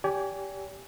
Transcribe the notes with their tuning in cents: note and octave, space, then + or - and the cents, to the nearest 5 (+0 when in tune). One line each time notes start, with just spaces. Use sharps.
G4 +0 D5 -45 G#5 +0